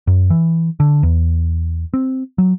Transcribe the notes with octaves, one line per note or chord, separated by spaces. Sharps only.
F#2
E3
D3
E2
C4
F#3